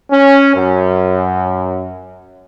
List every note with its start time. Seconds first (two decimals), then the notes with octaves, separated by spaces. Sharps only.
0.12 C#4
0.56 F#2